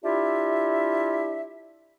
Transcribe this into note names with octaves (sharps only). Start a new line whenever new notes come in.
D4 E4 F4 G4 E5